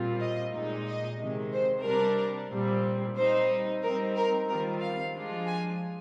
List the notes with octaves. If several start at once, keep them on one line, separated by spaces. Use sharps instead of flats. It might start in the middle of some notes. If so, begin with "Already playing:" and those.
Already playing: A#2 G3 C4 F4
D#5
A#2 G#3 D#4
D#5
C3 D#3 G#3
C5
C3 G3 D4 A#4
A#2 G3 C4
G3 C4 D#4 C5
G3 C4 D#4 A#4
A#4
D#3 G3 C4 F4 A#4
F5
F3 G#3 D4 F4
G#5